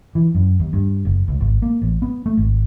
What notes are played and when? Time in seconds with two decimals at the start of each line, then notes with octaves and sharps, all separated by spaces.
0.15 E3
0.35 F#2
0.60 D#2
0.73 G2
1.05 F#1
1.28 C#2
1.40 G#1
1.62 A#3
1.82 A1
2.02 B3
2.26 A3
2.37 G#1